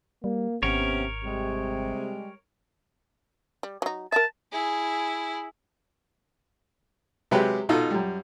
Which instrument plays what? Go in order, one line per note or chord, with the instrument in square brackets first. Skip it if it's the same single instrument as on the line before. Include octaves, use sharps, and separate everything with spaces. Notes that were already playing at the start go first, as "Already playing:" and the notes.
[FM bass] G3 [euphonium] A#3
[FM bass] G#1 [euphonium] C3 [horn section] B3 C#4 [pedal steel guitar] A#4 C#5
[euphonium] C3 [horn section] G3 G#3
[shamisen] G3
F#3 D#4
[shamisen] A#4 E5 [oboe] A5
[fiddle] E4 G#4
[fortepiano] C3 F#3 G#3 G4 B4
B2 D#4 F4 A4
F#2 G3